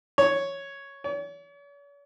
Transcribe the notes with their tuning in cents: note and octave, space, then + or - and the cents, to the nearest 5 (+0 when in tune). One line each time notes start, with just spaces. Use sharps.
C#5 +0
C#5 +45